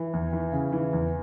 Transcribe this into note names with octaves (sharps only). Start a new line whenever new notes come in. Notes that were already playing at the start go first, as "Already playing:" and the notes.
Already playing: E3
E2
E3
C#3
E3
E2